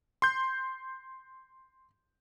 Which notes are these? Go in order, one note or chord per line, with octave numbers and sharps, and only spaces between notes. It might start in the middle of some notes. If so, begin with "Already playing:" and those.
C6 G6